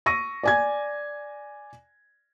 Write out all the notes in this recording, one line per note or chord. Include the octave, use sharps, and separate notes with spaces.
C#6 E6 A#6 D#7
D5 G#5 G#6